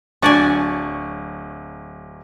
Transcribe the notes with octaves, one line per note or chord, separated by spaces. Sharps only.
D1 F#3 D4 D5 G#5 C#6